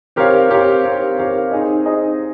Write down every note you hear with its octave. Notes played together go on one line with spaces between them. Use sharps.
C4 G4 A#4 C#5 F5
C4 G4 A#4 C#5 F5
C4 G4 A#4 C#5 F5
C4 G4 A#4 C#5 F5
C4 D#4 G#4 D#5
C4 D#4 G#4 D#5